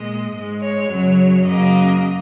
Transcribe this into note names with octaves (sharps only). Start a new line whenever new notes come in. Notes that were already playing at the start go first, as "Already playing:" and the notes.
Already playing: A#2 G#3 D#5
G#2 G#3
C#5
F#2 C#3 F#3 C#5
F#2 C#3 F#3 A#3 D#5